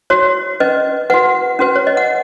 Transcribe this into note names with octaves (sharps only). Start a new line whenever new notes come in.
F#4 C#5
C#4 B4 D#5
F#4 B4 F#5
C#4 F#4 B4
C#5
D#5
F#5